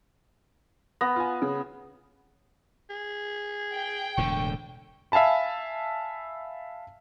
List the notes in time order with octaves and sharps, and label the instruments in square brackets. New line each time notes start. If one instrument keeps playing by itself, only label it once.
[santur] B3 [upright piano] A#6
[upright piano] F4 G#5
C#3
[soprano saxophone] G#4
[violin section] G5
[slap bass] E1 A2 D3 [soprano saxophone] C#6
[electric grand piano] E5 F5 G#5 A5 B5